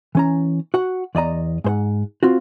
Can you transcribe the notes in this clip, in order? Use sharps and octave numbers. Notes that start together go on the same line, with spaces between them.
E3 C#4 A#5
F#4 F#5
E2 D5 D#5 A#5
G#2 C5 F#5
C4 F4 F#4